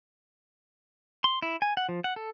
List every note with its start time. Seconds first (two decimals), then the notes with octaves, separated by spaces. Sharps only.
1.24 C6
1.42 E4
1.62 G#5
1.77 F#5
1.89 F3
2.04 F#5
2.16 A4